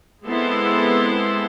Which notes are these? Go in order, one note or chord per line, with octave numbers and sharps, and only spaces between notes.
G#3 B3 C4 E4 A4 C6